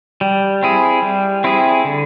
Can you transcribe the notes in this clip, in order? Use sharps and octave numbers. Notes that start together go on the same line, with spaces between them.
G3
C4 E4 G#4
G3
C4 E4 G#4
D3